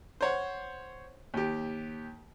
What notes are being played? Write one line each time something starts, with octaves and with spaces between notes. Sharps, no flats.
C5 C#5 F#5
D#2 G4